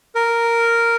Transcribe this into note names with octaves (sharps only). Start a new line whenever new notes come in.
A#4